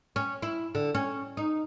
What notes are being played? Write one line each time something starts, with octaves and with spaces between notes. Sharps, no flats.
C#4
E4
D3
C#4
D#4